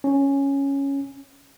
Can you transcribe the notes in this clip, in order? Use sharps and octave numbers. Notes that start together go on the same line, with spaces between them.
C#4